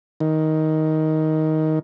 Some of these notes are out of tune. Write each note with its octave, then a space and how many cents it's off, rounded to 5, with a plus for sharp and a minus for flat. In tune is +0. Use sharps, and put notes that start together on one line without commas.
D#3 +10